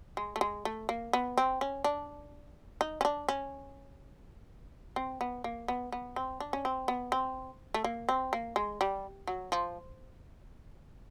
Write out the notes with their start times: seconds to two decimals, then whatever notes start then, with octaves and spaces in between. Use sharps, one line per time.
0.17 G#3
0.36 A3
0.41 G#3
0.65 A3
0.89 A#3
1.13 B3
1.38 C4
1.61 C#4
1.84 D4
2.81 D#4
3.01 C#4
3.05 D4
3.29 C#4
4.96 C4
5.21 B3
5.44 A#3
5.68 B3
5.92 B3
6.16 C4
6.40 D4
6.53 C#4
6.65 C4
6.88 B3
7.12 C4
7.74 A3
7.84 A#3
8.09 C4
8.33 A#3
8.56 G#3
8.81 G3
9.27 F#3
9.52 F3